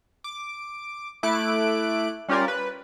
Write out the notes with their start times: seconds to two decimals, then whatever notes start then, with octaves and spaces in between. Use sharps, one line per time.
0.24 D6
1.23 A3 E4 D6 F#6 D7
2.28 G3 C#4 F4 G4 A#4 D5
2.48 B4